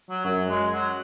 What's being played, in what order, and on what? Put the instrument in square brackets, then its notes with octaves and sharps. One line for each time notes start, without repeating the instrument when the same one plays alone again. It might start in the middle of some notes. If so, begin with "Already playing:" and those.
[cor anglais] F#3
[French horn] F#2 [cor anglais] F#3
[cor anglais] G#3
F#3